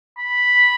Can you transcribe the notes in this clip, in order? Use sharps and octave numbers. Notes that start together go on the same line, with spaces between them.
B5